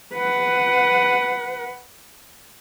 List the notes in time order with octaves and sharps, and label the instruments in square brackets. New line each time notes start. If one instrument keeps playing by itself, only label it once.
[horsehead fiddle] B4 F#5